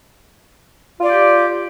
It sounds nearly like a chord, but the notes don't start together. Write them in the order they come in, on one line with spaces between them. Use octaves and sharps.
F4 D5 G4